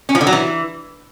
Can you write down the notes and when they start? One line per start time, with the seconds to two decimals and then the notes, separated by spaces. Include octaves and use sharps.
0.09 C#4
0.15 F3
0.21 D3
0.27 F#3
0.33 E3